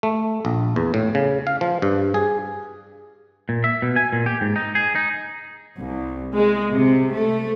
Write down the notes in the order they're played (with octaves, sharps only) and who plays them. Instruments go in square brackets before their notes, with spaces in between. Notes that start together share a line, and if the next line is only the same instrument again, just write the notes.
[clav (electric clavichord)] A3
A#1
E2
A2
C#3
F5
F3
G2
G#4
[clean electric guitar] A#2
E5
B2
G#5
A#2
G4
G#2
D#4
G#4
D#4
[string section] C2
G#3
C3
A3